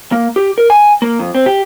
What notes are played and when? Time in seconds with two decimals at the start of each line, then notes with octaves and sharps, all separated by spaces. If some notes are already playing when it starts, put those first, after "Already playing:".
0.12 A#3
0.36 G4
0.58 A#4
0.70 G#5
1.02 A#3
1.19 F2
1.35 C4
1.46 G4